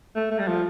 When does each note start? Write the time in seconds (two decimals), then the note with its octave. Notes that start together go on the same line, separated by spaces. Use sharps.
0.16 A3
0.31 A3
0.39 G3
0.48 F3